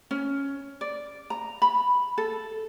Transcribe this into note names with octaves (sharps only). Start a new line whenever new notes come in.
C#4
D5
A#5
B5
A4